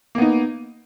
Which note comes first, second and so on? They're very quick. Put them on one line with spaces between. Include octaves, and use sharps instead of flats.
A#3 B3 D#4